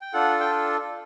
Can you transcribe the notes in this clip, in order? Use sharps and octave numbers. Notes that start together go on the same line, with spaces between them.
G5
D4 F4 A4 F#5
G5